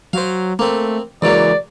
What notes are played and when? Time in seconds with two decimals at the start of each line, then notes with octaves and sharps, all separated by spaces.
0.13 F#3 C5 F5
0.59 A3 A#3 C4
1.22 C#2 E3 F#3 A#3 D5